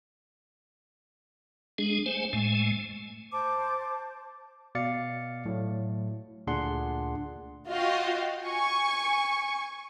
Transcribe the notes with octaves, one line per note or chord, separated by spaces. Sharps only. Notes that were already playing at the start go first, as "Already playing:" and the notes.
G#3 D4 G#4
A3 C5 G#5
A2 G#3 A3 G#5
C5 A5 D6
B2 D5 F5 A6 C#7
A2 F#3
D2 A#2 D4 G#4 F#5 C6
F4 F#4 D#5 F5 G5
G#5 C#6